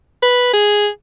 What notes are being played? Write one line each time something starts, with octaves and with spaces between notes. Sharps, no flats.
B4
G#4